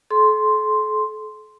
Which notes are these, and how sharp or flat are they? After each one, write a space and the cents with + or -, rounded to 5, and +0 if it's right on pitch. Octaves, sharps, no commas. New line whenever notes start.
A4 -40 C6 +0